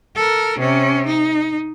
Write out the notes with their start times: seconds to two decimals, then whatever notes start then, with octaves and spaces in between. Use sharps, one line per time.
0.15 A4 A#4
0.59 C3 C#4
1.07 D#4